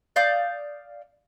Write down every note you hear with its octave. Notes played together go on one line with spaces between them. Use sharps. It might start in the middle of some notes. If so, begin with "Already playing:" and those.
D5 F5 D#6 G6